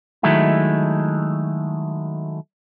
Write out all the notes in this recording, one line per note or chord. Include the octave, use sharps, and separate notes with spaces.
D#3 F#3 G#3 A3 E4